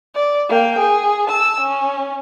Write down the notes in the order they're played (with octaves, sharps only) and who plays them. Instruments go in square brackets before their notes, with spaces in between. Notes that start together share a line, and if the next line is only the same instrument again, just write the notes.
[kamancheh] D5
A#3 G5
G#4
A5 E6
C#4